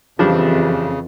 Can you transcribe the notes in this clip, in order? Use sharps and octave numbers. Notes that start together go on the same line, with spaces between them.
F2 C#3 E3 F3 G3 D4 G4 G#4